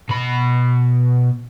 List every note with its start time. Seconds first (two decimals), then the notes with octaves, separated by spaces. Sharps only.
0.09 B2 B5